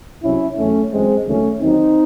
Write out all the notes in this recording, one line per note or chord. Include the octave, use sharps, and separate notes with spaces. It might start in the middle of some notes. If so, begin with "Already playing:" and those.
C2 C3 F#3 C#4 E4
E2 C#3 F#3 A3 C#4
F#2 E3 G#3 C4
C#2 C3 D#3 F#3 A3 C#4
D#2 D#3 F#3 C4 D#4